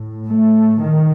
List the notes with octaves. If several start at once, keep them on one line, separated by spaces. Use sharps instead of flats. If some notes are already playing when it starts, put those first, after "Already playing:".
Already playing: A2
A3
A#2 D#3